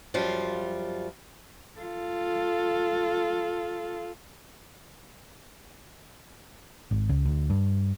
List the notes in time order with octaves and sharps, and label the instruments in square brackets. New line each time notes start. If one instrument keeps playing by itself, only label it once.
[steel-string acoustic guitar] F#2 F3 G3 F4
[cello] F4 A4
[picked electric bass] G#1
C#2
D2
G2